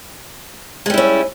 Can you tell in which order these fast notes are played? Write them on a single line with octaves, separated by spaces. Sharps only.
G#3 G3 E4 C#4